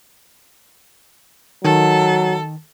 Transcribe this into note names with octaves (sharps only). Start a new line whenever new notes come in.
D#3 F#3 A4